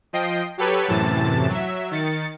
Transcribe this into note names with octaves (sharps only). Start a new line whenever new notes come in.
F3 D#5 G5 C7
F#3 G4 A4 B4 C#5
F#2 A2 C3 E3 A5 A6
F#3 E5
D#3 A6 C#7